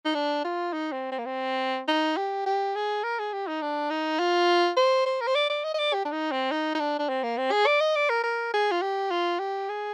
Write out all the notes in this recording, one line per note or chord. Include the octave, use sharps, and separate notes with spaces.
D#4
D4
F4
D#4
C4
C4
A#3
C4
D#4
G4
G4
G#4
A#4
G#4
G4
D#4
D4
D#4
F4
C5
C5
A#4
C5
D5
D5
D#5
D#5
D5
G4
D4
D#4
C4
D#4
D#4
D4
D4
C4
A#3
C4
G#4
D5
D#5
D5
A#4
A#4
G#4
F4
G4
F4
G4
G#4